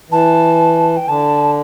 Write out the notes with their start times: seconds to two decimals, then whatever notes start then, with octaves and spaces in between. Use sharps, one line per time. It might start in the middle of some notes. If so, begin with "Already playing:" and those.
0.10 E3 A5
0.96 G5
1.07 D3 A5